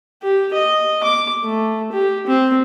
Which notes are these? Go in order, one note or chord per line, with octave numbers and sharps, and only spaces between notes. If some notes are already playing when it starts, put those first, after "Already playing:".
G4
D#5
D6
A3
G4
C4